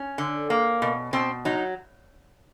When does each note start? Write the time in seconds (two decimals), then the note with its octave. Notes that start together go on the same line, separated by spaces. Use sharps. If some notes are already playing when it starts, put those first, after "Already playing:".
Already playing: C#4
0.18 D3
0.50 A#3
0.82 B2
1.13 B2 C4
1.45 F#3 D#4